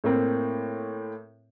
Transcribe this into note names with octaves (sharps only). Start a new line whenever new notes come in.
A2 A#3 C4